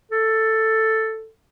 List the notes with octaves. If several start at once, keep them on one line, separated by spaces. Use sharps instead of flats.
A4